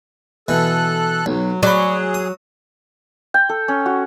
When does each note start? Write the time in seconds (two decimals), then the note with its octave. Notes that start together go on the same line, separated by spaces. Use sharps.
0.48 B2 E3 A4 F#6
1.26 B1 F#3
1.63 F#3 G#4 D5 B5
2.14 D#6
3.34 G5
3.49 A4
3.68 C#4
3.86 F#4